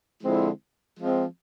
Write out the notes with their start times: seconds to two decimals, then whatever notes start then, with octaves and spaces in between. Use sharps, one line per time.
0.23 D3 F3 G#3 C4 E4
0.98 F3 G#3 C4